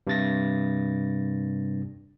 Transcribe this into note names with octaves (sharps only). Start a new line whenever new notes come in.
G2 C3 A6 A#6